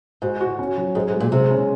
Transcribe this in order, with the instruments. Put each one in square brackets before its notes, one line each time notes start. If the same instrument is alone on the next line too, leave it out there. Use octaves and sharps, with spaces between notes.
[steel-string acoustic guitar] G#2 [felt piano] F#4
[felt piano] F#4
C#4
F#3
[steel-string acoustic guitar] G#2 [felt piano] G#4
[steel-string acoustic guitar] G#2
[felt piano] G#3
[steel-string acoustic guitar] A#2
[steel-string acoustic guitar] C3 [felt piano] G#3
[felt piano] C#4